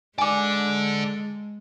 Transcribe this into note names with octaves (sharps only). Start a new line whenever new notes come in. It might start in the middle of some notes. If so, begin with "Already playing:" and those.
G#3 A4 D5 G#5 D6